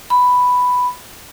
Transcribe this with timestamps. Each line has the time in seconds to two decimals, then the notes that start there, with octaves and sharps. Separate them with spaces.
0.10 B5